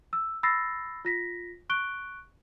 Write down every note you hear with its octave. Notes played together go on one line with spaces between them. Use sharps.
E6
B5 E6 A6 A#6 C7
F4 A#6 B6
C#6 F#6 D7 G7